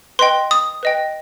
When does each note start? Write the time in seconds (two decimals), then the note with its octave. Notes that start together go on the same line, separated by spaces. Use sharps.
0.19 B4 D#5 G5 C6
0.51 D#6
0.83 B4 D#5 G5